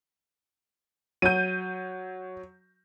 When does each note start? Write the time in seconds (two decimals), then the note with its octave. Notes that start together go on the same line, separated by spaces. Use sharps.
1.22 F#3 G6 D#7